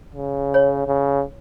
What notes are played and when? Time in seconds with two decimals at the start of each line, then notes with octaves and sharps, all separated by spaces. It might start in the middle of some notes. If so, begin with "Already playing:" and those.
0.14 C#3
0.54 C#5
0.87 C#3